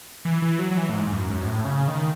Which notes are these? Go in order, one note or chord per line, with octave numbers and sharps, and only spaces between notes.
E3
E3
F#3
F#3
E3
A2
G#2
G#2
F#2
F#2
G#2
A2
C#3
D#3